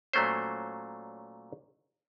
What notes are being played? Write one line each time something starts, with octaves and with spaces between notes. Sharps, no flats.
A#2 F#3 A3 C#4 C5